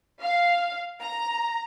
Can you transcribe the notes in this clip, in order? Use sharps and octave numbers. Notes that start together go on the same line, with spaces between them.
F5
A#5